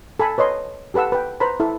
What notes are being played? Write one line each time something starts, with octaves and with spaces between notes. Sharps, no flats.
A4 G#5 B5
B4 C#5 D#5 C6
G4 A4 B4 F#5 E6
B4 G5
B4 C5 A#5 B5
E4 A4